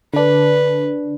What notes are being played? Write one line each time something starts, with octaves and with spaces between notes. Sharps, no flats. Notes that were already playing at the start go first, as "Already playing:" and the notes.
D3 D4 B4